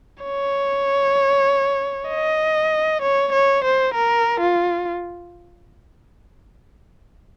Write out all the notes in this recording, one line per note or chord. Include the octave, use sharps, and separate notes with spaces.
C#5
D#5
C#5
C#5
C5
A#4
F4